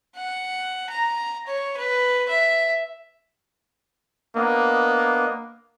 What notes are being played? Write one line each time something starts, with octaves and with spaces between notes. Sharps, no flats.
F#5
A#5
C#5
B4
E5
A#3 B3 D4 D#5